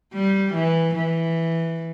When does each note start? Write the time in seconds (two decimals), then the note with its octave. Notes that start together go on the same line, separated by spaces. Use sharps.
0.14 G3
0.54 E3
0.95 E3